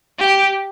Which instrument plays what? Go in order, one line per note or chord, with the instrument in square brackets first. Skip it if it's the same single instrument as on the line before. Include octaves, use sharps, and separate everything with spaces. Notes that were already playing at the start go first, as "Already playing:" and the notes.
[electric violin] G4